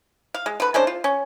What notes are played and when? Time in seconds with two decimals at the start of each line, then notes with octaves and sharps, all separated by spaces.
0.34 F5
0.46 G#3
0.60 D3 B4
0.74 G#3 C#4 D4 C5
0.87 F4
1.04 C#4